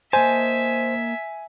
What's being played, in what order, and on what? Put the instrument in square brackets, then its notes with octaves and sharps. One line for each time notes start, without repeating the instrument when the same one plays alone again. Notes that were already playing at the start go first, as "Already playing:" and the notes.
[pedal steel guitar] A#3 D#5 A5 [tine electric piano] C5 [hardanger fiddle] E5 [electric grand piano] G#5